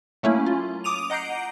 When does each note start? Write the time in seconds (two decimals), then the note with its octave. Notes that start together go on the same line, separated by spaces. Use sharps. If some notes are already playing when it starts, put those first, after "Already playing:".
0.23 F#3 A3 A#3 C#4 E4
0.46 F4
0.84 D6 D#6 D#7 F7
1.10 D#5 F#5 A#5 G6 C7 D7